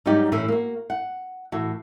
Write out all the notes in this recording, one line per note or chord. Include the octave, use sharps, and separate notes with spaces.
G#2 F#3 G3 C#4 D#4 G4
A2 E3 C#4 E4
A#3 F#4
F#5
A2 E3 F#4